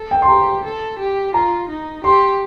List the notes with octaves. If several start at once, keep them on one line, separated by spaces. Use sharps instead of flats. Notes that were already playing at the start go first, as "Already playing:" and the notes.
Already playing: A4
G5
C6
G4 A#5
A4
G4
F4 A#5
D#4
G4 C6